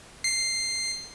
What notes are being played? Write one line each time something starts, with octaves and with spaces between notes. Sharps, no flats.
C7